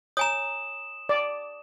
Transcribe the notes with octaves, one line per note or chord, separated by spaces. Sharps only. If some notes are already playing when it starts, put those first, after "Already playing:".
C#5 G#5 A#5 D#6 E7
D5